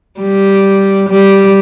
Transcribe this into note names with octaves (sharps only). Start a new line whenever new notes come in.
G3
G3